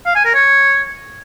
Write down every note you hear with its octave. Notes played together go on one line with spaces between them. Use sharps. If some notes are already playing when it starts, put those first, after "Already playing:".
F5
G#5
A#4
C#5